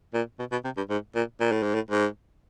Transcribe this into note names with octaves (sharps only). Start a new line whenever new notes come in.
A#2
B2
B2
C3
G2
G#2
A#2
A#2
A2
G#2
A2
G#2